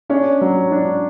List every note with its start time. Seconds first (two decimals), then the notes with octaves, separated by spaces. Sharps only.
0.09 C#4 D4
0.41 F#3
0.71 D4